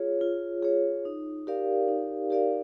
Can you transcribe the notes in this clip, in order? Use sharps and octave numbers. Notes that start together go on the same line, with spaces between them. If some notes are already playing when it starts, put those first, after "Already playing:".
Already playing: F4 G#4 C#5
F4
G#4 C#5
D#4
G4 A#4 D5 F5
D#4
G4 A#4 D5 F5